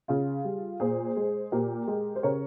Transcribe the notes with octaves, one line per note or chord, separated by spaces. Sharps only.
C#3 F4 G#4
G3
A#2 G#4 C5
G#3
A#2 G4 A#4
G#3
C5
C#3 A#4 C#5